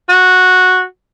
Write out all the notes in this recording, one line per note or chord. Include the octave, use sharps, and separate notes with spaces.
F#4